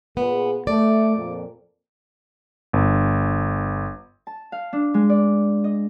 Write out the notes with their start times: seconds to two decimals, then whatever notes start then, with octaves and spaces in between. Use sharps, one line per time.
0.17 A#2 B3 G#4 B4
0.67 A3 D5
1.17 F2 A#2
2.73 G1
4.27 A5
4.52 F5
4.73 D4
4.94 G#3
5.10 D5
5.64 D#5